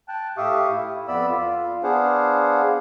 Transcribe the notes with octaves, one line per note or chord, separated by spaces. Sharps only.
G5 A5 F#6
A2 G4 E5 F5 C#6 D#6
E4
F2 B3 D5 B5 E6
F4
B3 D4 G#4 C5 F5 F#5